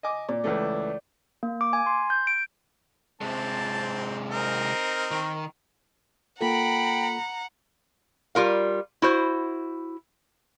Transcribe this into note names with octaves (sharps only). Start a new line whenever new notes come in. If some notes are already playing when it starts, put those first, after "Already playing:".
D#5 G#5 D6
A#2 D5
C#2 E3 A3
A#3
D6
G#5
C6
G6
D7
C3 G#3 C4 A5
C4 D#4 A#4
D#3
A#3 F4 A4 F#5 G5 A#5 B5
G3 F4 A#4 F5
E4 F#4 C5